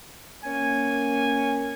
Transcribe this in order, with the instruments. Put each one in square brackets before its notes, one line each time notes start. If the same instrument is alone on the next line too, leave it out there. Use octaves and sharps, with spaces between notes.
[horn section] A#3 C#4 G#5